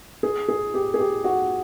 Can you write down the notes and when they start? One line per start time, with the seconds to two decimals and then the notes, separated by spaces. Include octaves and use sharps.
0.23 G#4
0.48 G#4
0.74 G4
0.94 G#4
0.99 G4
1.24 F#4